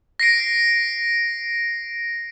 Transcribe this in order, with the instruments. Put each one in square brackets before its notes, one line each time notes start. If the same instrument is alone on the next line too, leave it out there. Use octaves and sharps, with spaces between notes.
[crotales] A#6 C7 D7